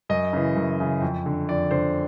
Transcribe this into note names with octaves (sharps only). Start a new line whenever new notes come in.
F#2 D#5
C#3 E3
F#2
C#3 E3
F2
D3
F2 D5
D3 C5